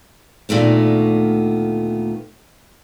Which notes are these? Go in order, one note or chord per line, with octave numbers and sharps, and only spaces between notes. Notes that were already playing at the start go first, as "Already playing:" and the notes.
D2 A#2 D#3 A3 B3